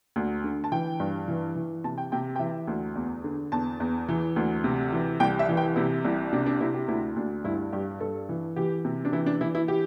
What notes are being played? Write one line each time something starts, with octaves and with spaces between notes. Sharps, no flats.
D2
D3
A5
E3 G5
G2
E3
E3
C3 A5
G5
C3 G5
G5
E3 E5
D2
E2
D3
E2 A5
E2
E3
D2
C3
E3
C2 G5
E5
E3
G5
C3 E4
C2 E4
C3 D4
D4
C3 E4
G4
D2 E4
D2 D4
G2 E4
G2 G4
G2 A4
E3
E3 G4
C3
D4
E3 E4
D4
E3 E4
E4
G4